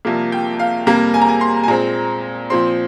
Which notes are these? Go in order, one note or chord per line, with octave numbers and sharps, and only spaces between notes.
C2 C3 F3 A#3
G5
F5
F2 C3 G3 A#3 A#5
G#5
A#5
G#5
C6
G#5
A#2 G#3 C4 A#5
A#2 F3 C4 C6